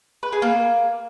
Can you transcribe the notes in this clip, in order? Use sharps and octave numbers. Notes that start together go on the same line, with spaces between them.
B4
G#4
A#3